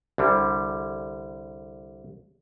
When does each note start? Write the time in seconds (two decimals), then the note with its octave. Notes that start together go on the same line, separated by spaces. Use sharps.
0.18 C2 D3 G3